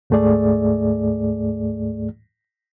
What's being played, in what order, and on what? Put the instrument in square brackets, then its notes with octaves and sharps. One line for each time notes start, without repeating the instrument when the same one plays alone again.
[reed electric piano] D2 G#2 A3 G#4 D5